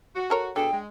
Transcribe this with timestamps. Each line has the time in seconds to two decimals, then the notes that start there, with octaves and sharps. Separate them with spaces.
0.15 F#4
0.30 A4 A#4 C#5
0.56 B2 D4 G#4 A4 G5
0.72 G#3